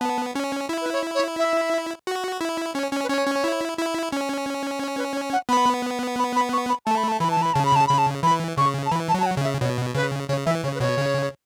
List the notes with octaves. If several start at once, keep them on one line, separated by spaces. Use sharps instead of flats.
B3 A5
C#4
E4
B4
C#5
C#5
E5
F#4
E4
C#4 C#5
C#4
B4
C#4 C#5
C#4
E4
E4
C#4
C#5
B4
C#5
F#5
B3 B5
B5
B5
C#6
B5
A3 A5
B5
A5
E3 B5
A5
B5
C#3 A5
B5
A5
C#3 B5
A5
E3 B5
C#3 C#6
A5
E3 B5
A5
F#3
A5
F#5
C#3
E5
B2 C#5
C#3 B4
C#3 C#5
E3 E5
C#3 C#5
B4
B2 C#5
C#3